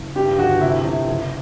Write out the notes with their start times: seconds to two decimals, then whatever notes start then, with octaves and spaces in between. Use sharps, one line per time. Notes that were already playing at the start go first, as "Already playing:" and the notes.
Already playing: F#1
0.16 G2 G4
0.39 G1 F#4
0.61 C3 E4
0.85 C3
1.07 F#1